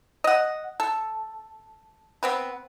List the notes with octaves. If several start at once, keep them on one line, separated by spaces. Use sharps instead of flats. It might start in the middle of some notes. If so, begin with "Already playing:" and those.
D#5 F#5
A4
B3 C4 B4